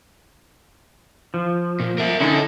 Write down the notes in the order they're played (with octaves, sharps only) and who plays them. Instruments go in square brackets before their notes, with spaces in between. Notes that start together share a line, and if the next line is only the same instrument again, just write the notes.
[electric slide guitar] F3
[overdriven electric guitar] A#2
A#4 E5
[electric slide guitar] D3 C#4 D#4 [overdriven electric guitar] E4 A4